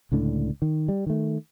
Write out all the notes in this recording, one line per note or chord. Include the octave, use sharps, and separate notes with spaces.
C#2 A2 D3 D4
D#3
G3
D#3 A3